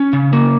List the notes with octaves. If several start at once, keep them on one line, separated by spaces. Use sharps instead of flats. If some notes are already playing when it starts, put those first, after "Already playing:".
Already playing: C#4
C#3
A#3